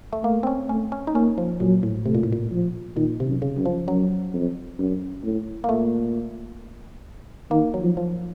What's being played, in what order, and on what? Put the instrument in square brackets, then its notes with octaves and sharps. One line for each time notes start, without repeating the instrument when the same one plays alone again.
[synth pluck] A3
[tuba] A3 [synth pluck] A#3
[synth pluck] C4
C#4
[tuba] A3 [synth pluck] C#4
[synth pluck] C#4
D#4
[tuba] A#3 [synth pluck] C#4
[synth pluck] F3
[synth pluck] A#2 [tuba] F#3
[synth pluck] A2
[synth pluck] C3 [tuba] A3
[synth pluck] A#2
A2
A#2
[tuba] F3
[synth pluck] A#2 [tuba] D#3
[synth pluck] C3
[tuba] F#2
[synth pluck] C#3
[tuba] F#2
[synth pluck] F3
[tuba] F#2 [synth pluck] F#3
[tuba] F2
F#2
A2
[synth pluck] A#3
[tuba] A#2 [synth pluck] A3
[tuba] D#3 [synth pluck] A#3
[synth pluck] F#3
[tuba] F3
[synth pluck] F3